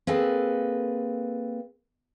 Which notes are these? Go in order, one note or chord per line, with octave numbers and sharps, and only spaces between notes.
A#3 C4 G#4 A4 B4